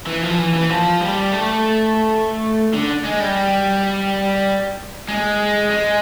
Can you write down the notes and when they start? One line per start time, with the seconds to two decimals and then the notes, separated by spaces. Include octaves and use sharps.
0.06 E3
0.22 F3
0.38 E3
0.54 E3
0.70 F3
1.01 G3
1.32 A3
2.74 D3
3.04 G#3
3.20 G3
5.09 G#3
5.71 G#3